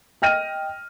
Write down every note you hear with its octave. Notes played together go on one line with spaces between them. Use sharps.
D#5 G5 F6 A#6 D#7